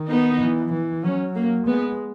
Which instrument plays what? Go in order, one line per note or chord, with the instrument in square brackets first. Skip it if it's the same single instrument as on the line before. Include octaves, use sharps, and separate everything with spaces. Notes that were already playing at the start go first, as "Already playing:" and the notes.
Already playing: [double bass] D#3
[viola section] B3 D#4
[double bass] E3
E3
[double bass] F#3 [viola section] C#4
[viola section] A#3
[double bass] G#3 [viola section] B3